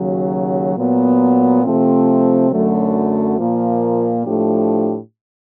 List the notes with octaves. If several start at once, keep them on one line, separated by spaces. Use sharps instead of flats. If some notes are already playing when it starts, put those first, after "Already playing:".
Already playing: D#2 C#3 F#3
A#2 F#3 B3
C3 F3 A3 C4
F#2 D3 F#3 A3
A#2 F3 A#3
A2 F3 A3 D4 G4